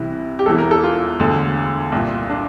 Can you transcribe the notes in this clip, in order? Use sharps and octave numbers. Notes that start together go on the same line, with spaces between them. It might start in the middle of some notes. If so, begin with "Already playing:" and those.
Already playing: C2 C3 E3 E4
G4
E1 E2 E3 A4
A#4
A4
F4
E1 D2 D3
C2 A#2
D4